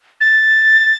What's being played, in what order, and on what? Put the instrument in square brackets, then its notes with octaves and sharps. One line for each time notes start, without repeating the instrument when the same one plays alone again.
[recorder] A6